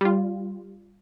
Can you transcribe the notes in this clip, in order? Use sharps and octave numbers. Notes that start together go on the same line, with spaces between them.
G3 F4